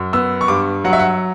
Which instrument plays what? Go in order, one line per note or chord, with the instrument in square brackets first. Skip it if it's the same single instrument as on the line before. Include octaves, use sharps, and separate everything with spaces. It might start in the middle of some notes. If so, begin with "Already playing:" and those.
Already playing: [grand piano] F#2
B3 E6
C#6
G2 D6
F#3 F#5
E5
F#5